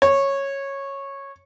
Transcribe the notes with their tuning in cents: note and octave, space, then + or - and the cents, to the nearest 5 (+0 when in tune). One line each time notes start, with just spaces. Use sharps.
C#5 -10